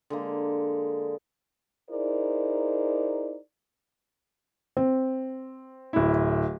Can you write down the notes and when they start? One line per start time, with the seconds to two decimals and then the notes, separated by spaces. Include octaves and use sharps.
0.10 D3 G#3 A#3
1.90 D#4 E4 G#4 A#4 C5 D5
4.77 C4
5.93 D1 E4